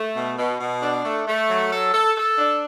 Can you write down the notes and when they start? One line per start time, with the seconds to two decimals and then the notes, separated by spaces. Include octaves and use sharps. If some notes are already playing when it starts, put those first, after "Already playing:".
Already playing: A3
0.15 B2
0.37 B2
0.60 B2
0.82 D4
1.05 A3
1.26 A3
1.49 F#3
1.71 A4
1.93 A4
2.17 A4
2.38 D4